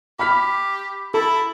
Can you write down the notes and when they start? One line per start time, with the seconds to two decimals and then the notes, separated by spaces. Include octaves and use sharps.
0.19 G4 B5 F6 B6
1.14 E4 A4